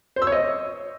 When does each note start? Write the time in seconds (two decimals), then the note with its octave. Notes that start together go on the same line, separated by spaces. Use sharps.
0.16 C5
0.22 E6
0.27 C#5
0.32 D#5